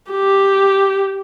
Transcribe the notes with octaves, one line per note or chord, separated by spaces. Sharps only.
G4